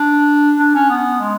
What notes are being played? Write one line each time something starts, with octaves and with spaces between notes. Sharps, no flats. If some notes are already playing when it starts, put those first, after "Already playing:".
Already playing: D4
D4
C#4
B3
G#3